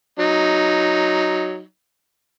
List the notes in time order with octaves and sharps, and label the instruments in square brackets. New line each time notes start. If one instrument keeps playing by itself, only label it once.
[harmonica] F#3 D#4